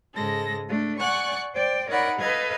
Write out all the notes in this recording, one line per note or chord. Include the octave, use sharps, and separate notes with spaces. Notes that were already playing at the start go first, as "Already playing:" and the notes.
G#2 C#3 G#3 A4 A#6
A3 D4
D5 F#5 G#5 C#6 F#6
C5 D5 G5
D#4 A#4 C#5 D5 F#5 B5
A4 B4 D#5 F5 G#6